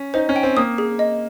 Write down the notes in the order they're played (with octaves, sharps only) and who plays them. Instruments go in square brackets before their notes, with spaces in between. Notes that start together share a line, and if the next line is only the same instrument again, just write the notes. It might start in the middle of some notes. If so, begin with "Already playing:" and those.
Already playing: [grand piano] C#4
[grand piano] D#4 [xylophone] C5
[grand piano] C#4
[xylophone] G5
[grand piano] C4
[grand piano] A#3 [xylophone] D#6
[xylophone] G#4
D#5